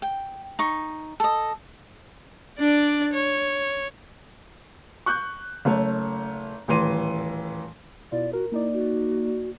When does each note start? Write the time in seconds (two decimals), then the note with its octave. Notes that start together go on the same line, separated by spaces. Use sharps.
0.02 G5
0.59 D#4 C#6
1.20 A4 D#5
2.60 D4 D5
3.13 C#5
5.06 C#6 F#6 G6
5.65 F#1 A3 C#5
6.68 D#1 A2 E3 C6 D#7
8.12 B2 E4 F4 D5
8.33 F#4 A#4
8.52 A#3 D#4 E4 D5
8.73 F#4